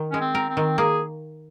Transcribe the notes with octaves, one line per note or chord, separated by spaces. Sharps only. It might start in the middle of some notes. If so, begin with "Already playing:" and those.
Already playing: D#3
G#3 C#4
C4
A#4
C4
D#3
A#3 G#4